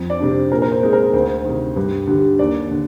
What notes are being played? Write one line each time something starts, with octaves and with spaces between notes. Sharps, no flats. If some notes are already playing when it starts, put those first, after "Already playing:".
Already playing: F2
D5
C3 G3 D4
C5
A#2 A#4
A#4
C5
G#3 C4 D#4
A#4
D2 C5
C3 D#3
G2
D3 G3
D#2 D5
D3